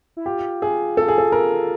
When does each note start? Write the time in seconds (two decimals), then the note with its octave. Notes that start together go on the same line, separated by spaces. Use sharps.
0.17 E4
0.26 F4 G4
0.62 G#4
0.97 A4
1.08 G#4
1.18 A4
1.32 A#4